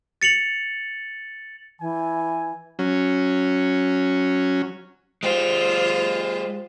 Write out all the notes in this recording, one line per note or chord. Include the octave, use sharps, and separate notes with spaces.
A6 C#7 F7 F#7
E3 G#5
F#3 C#4
G#3 F4 G4 C5